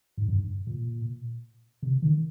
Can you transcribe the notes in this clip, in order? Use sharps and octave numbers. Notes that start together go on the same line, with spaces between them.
G#2
G2
A#2
C3
D#3